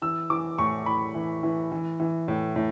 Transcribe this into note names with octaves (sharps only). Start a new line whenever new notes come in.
E3 E6
E3 D6
A2 C#6
A2 B5
E3
E3
E3
E3
A2
A2